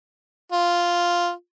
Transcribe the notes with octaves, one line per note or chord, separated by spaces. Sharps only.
F4